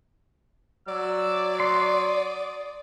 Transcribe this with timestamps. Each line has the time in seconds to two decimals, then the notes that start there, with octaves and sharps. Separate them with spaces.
0.88 F#3 D5 E6
1.60 C6 D#6